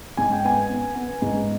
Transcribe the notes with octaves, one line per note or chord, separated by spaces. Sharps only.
G#2 G#5
G5
B3 G#5
B3
B3
G#2